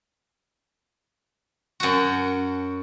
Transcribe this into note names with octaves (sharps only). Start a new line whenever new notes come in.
F#2 F#4